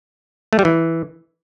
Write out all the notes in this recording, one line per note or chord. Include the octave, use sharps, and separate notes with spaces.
A3
G3
E3